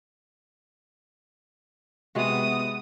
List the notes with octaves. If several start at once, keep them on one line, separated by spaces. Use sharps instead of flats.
C3 G#3 B3 F#4 D#6